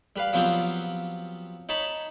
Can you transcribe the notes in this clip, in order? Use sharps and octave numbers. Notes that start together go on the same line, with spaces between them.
G3 B4 F5
F3 F#3 B3 C4 F4 G4
D#4 C#5 A5 B5